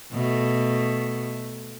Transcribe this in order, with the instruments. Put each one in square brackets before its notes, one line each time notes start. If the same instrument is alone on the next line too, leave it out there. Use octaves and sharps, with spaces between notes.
[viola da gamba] B2 A3